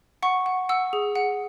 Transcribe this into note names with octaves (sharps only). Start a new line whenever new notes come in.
F#5 C#6
F#5
F#5 E6
G#4
F#5